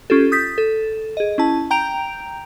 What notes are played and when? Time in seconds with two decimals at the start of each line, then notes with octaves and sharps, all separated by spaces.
0.10 C#4 F4 G4 A4
0.32 D#6 G6 A6 B6
0.58 A4
1.17 G#4 D#5
1.38 C#4 E4 A5
1.71 G5 A#5 G6 D7 F7